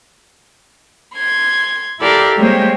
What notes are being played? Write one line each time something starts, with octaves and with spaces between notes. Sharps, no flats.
C6 G#6
E4 G4 A4 A#4 D5 F5
G3 G#3 A#3 C4 G4 C#5